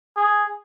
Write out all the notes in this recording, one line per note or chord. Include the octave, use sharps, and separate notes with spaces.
G#4